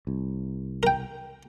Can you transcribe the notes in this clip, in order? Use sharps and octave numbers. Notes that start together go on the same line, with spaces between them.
C2
A#4 G5